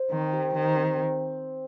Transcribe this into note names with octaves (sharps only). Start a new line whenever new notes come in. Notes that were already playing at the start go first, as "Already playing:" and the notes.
Already playing: C5
D#3 C4
G4
D#3 C5
C4
C4